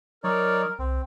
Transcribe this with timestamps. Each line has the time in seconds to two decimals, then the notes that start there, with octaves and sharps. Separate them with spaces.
0.24 F#3 D#4 A#4 C#5 D5
0.79 C2 C4